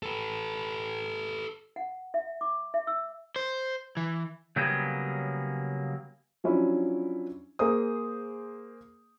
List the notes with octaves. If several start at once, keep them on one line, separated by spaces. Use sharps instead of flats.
A4 B4
F#5
E5
D6
E5
E6
C5
E3
C#3 F#3 G3 A#3 B3 G#4
F3 F#3 C#4 D4 E4
A#3 G#4 C5 D#6